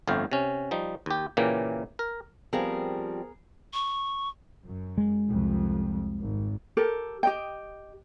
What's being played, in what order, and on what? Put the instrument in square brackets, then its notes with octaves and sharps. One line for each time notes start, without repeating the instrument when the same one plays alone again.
[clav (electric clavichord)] G1 F2 A3 F5 G5
C3 C#4
F3 G3 D#4
D#2 G4
A#2 C#3 E3 A#3 G4
A#4
[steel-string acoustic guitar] F3 G3 C4 [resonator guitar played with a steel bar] B3 G#4 A#4
[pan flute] C#6
[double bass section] F#2
[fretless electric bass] G#3
[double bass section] C2 F2
G#1
[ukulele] G4 A4 A#4
G4 D#5 G5